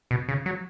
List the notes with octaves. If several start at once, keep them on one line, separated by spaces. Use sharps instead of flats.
B2
C#3
F#3